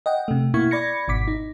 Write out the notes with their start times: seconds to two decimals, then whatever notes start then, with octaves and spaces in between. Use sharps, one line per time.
0.06 D#5 F#5 G5
0.28 C3 A3
0.54 B2 A#3 E4 C#6 G#6
0.71 D5 B5 G#6 A#6 C#7
1.08 G#1 B2 D6 B6
1.28 D#4